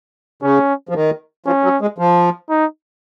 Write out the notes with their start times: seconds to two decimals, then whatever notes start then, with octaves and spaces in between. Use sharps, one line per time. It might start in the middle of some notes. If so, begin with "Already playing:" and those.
0.43 C#3 C#4
0.89 F3
0.95 D#3
1.46 F3 C#4
1.64 F#3
1.81 G#3
1.98 F3
2.50 D#4